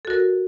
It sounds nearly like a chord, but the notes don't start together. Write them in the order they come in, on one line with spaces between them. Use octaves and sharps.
A4 F#4 A#4